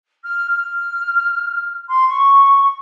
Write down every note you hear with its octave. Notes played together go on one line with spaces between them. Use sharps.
F6
F6
C6
C#6